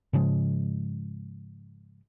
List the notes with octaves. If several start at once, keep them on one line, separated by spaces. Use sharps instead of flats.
G#2 C#3 F3 G#3